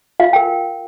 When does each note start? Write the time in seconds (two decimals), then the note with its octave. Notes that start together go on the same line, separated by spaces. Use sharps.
0.20 F4 F5
0.33 A#4 G5